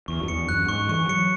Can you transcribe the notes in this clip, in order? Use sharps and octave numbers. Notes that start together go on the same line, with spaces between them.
E2 C#6
F#2
E2 C#7
F#2 F#6
G#2 C#6
E3 C#6
F#3 C#7